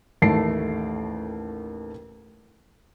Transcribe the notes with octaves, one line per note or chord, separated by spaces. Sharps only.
A1 D#2 A3 A5 C7 D7